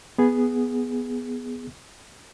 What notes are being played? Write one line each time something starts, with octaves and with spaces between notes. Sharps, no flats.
B3 G#4